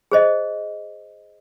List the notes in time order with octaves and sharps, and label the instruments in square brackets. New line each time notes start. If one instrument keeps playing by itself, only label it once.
[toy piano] G#4 C5 D#5